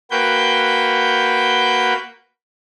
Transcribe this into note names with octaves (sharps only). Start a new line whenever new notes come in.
A#3 F#4 B4 G5 G6